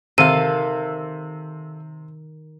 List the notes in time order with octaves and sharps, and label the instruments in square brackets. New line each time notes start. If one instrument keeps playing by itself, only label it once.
[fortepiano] C3 [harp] D#3 [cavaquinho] A4 F5 [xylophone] D#7